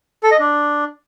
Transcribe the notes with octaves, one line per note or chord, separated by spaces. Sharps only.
A4
D#5
D4